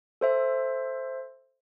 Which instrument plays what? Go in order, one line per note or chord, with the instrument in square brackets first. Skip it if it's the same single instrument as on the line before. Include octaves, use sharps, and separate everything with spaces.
[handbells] A4 C5 E5